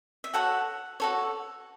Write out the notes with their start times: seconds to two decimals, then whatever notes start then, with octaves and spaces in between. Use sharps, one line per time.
0.24 E5
0.34 F#4 A4 C#5 F#5
1.00 F#4 A4 C#5